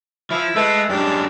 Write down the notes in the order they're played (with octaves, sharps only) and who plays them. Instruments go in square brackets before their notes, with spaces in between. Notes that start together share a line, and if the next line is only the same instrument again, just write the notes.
[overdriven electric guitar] F3 [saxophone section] E4
[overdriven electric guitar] G#3 [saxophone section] A3 A4 B4
[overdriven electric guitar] F#2 D4 [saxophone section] G3 G#3